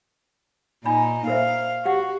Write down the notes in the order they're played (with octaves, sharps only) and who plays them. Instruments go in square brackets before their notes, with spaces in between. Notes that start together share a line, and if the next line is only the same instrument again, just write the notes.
[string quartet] A#2 D#4 [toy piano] G#5 B5
[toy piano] A#4 C5 E5 [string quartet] F5
[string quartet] F#4 [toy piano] G4 F#5